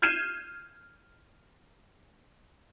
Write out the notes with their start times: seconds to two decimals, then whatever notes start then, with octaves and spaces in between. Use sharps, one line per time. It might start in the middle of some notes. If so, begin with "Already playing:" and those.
0.02 F6 G6 G#6 C7 D#7 E7